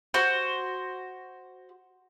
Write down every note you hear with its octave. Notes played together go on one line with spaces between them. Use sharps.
F#4 C5